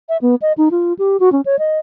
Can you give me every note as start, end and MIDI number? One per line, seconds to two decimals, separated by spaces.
0.09 0.17 76
0.22 0.35 59
0.42 0.53 75
0.58 0.69 63
0.71 0.93 65
0.99 1.19 67
1.20 1.32 66
1.32 1.41 61
1.45 1.58 73
1.59 1.79 75